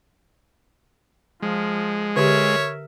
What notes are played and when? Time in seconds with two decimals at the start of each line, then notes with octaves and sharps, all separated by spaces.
1.42 F3 G#3
2.16 D3 G4 A#4 C#5 E5